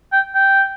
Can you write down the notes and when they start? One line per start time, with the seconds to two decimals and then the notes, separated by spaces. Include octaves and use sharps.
0.12 G5
0.35 G5